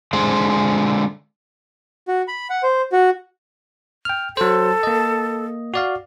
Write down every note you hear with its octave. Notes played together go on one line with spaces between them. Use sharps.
D3 G#3 C5
F#4
B5
F#5
C5
F#4
G5 F6
F#3 A4 C5
A#3 D#5
F#4 D5 F5